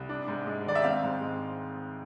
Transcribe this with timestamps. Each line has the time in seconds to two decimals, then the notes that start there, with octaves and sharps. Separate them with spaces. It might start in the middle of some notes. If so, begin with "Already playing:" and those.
Already playing: C2
0.09 D4
0.28 G#2
0.47 G#3
0.66 G#1 D5
0.75 E5
0.84 C4 F5
1.03 G#2
1.21 G#3